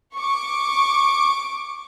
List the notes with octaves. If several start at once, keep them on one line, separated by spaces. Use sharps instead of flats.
C#6 D6